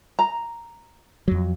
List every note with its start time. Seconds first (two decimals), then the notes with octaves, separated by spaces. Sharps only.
0.19 A#5
1.28 F2 F#3